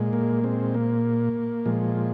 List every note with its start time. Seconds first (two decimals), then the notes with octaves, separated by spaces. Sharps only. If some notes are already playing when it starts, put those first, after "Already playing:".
Already playing: A#2 G#3
0.13 A#3
0.44 G#3 C4
0.74 A#3
1.65 A#2 F3 G#3